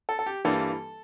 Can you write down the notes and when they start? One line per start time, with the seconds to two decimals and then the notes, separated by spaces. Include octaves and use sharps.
0.09 A4
0.19 A4
0.26 G4
0.45 G2 E3 G3 A#3 A4